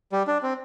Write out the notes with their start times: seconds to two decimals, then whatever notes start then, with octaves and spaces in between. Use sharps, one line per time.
0.12 G3
0.27 D4
0.43 C4